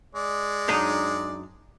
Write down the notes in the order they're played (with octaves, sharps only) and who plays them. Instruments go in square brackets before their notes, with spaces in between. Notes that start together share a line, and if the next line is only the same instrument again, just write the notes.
[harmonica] G#3 D5
[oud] F#2 D4 D#4